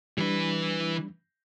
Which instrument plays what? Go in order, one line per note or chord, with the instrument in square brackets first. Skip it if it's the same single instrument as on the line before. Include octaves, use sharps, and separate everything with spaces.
[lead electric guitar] E3 B4 [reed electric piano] G3 D4